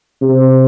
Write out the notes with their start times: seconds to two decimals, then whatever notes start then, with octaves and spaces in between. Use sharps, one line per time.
0.22 C3